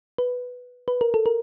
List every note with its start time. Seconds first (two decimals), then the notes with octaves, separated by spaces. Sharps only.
0.18 B4
0.88 B4
1.01 A#4
1.14 A4
1.26 A#4